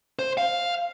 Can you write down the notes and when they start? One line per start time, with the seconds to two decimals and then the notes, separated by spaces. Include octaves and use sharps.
0.19 C5
0.38 F5